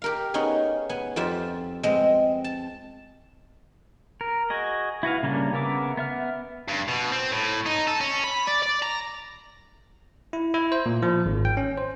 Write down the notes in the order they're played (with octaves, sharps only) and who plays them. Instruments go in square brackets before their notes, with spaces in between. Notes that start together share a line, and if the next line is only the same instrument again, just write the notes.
[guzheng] G4 A#4 F5
B3 C#4 D#4 G#4
B3 G#5
F2 F4 G4 C5 E5
G#3 B3 C4 D#5
A5
[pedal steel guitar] A#4
F#4 G#4 D#5
E4 F#4 B4 F5
C#3 G3 A#3 C#4 D4
C#3 B3 A#4 E5 D6
B3 E5 F6
[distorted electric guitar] G2
B2
C4
A2
D#4
A4
C#4
B5
D5
D5
A#5
[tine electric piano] E4
E4
C5
A#2
F3
G#1
G5
C#4
C5